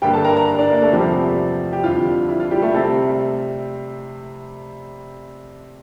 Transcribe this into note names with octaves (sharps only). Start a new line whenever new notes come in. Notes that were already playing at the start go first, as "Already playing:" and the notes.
G2 D3 G3 A#3 G4 G5
A4 A5
A#4 A#5
A#4 A#5
D4 D5
A#3 A#4
A3 A4
E2 C3 F3 G3 A3 C4 G4
G4
F2 D3 G3 F4
E4
F4
G3 G4
A3 A4
C3 G3 A3 C4 A4